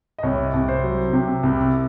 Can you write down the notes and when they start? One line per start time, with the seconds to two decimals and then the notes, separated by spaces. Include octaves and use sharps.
0.18 D#5
0.23 C2 C#5
0.54 C2
0.68 C5
0.83 F#3
1.13 C3
1.43 C2